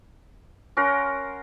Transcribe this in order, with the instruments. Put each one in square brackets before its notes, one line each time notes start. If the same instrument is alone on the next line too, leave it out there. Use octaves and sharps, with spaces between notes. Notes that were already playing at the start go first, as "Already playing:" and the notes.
[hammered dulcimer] C#4 A#4 F#5 C6